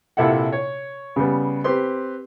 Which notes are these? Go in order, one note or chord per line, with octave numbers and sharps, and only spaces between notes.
A#1 C3 E4 A4 F#5
C#5
C#3 G3 B3
C4 G4 B4 C6